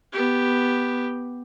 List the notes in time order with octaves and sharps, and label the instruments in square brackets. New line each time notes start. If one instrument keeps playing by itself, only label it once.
[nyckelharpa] B3 G4